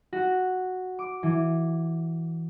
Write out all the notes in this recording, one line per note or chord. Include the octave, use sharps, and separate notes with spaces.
F#4
D6
E3